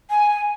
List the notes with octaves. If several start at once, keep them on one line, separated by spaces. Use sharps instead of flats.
G#5